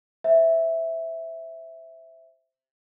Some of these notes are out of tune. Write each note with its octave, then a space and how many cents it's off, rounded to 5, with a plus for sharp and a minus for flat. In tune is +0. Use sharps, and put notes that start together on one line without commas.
C5 +0 E5 -5